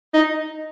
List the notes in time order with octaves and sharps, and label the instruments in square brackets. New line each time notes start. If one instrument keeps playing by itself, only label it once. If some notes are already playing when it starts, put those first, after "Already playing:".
[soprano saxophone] D#4